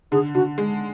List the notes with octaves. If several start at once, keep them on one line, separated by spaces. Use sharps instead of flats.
D3 G#4
D3 F#4
G#3